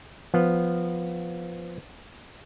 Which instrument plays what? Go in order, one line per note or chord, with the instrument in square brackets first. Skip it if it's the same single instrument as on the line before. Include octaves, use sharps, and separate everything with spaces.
[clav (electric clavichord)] F3 B3